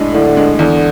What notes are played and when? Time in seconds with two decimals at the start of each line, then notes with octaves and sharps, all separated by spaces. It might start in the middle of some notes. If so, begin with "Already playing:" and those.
Already playing: A2 G#3 D4
0.13 A2 D3
0.36 G#3 D4
0.59 E2 D3